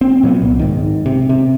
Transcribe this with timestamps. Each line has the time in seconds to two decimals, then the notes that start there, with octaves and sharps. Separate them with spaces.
0.01 C4
0.23 A#2 F#3 A3 B3
0.42 C2
0.59 G#2 D#3
1.06 C3
1.29 C3